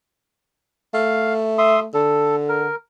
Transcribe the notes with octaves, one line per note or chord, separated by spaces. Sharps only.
A3 F5
E5 C6 D#6
D3 A4
A#4